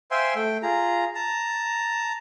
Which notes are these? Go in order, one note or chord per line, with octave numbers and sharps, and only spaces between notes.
C5 E5 F5 G5 G#5 C6
A3 G5
F4 G#4 A#5
A5 A#5